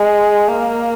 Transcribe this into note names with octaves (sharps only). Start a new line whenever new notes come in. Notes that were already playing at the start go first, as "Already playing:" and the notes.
Already playing: G#3
A#3